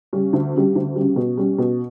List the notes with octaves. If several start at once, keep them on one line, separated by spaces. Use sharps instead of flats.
C#3 G3 C#4
D2
C#3 G3
D2
C#3 G3
B2
G3 C#4
B2